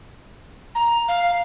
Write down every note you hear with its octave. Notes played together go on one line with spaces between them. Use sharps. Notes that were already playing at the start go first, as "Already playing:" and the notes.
A#5
F5